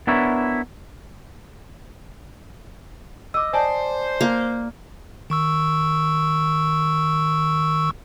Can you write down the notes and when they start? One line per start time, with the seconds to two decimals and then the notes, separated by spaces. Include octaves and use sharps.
0.07 B3 D4 E4 A#4 C#5 E5
3.34 D#5 D6 E6
3.53 C5 D5 G#5 A5
4.21 A#3
5.30 D#3 C#6 E6